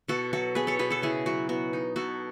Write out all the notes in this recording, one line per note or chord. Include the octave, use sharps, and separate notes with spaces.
B2 F#4 A4
F#3 F#4 A4
B3 G#4 B4
A4 C#5
B2 G#4 B4
F#4 A4
C#3 E4 G#4
F#3 F#4
B3 F#4
D#4
B2 F#4 A4